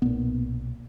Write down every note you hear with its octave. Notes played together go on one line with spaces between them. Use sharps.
B1 A#2 B3